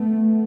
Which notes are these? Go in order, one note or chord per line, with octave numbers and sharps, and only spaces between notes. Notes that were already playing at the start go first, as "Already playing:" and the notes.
Already playing: A3 B3